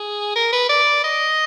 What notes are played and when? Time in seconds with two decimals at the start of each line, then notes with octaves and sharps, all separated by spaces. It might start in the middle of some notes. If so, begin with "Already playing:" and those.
Already playing: G#4
0.35 A#4
0.52 B4
0.69 D5
1.04 D#5